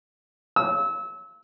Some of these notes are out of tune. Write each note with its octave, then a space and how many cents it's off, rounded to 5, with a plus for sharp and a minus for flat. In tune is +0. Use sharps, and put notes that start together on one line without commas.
E6 -30